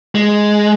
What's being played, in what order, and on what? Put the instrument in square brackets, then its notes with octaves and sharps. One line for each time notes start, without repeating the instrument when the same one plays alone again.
[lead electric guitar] G#3